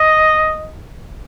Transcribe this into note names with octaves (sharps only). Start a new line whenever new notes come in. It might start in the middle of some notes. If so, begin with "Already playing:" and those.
Already playing: D#5